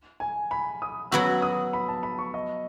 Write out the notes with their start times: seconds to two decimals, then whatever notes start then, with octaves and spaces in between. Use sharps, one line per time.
0.20 G#5
0.51 B5
0.82 D#6
1.12 F#3 B3 F#4 E6
1.42 D#6
1.73 B5
1.88 A5
2.03 B5
2.18 C#6
2.34 D#5